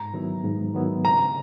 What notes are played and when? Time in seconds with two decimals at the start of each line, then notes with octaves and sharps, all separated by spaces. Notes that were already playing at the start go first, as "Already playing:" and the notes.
Already playing: G#2 A#5
0.14 D#3 F#3 B3 E4
0.44 G#2
0.74 D#3 F#3 B3 E4
1.04 C#3 A#5